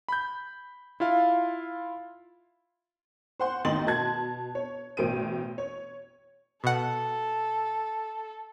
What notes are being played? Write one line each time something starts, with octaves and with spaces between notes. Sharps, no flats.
B5 G6
E4 F4 F5
C5 F#5 C6
A1 D#3 D#5 C6 A6 F#7
B2 A5 G#6
C#5
A1 B2 C5 D7 D#7
C#5
B2 A4 F#5